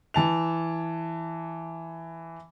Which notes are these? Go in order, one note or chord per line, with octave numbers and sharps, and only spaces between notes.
E3 A5 F7